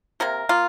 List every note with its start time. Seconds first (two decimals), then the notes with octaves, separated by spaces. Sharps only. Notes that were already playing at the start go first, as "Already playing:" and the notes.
0.20 C3 A#3 A#4
0.49 A#3 F4